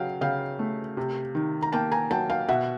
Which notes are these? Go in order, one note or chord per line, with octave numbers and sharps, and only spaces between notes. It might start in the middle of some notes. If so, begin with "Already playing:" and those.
Already playing: C#3 F#3 F5 G5
C#3 F5 G5
A3
C3
D#3
A#5
A#3 G5 A5
G#5 A#5
F#3 G5 A5
F5 G5
B2 E5 F#5